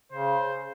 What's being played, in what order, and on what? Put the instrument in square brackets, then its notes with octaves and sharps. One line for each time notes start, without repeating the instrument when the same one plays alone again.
[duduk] C#3 [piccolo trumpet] C5